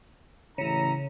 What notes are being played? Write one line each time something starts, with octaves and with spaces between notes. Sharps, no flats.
A1 C#3 E4 A#5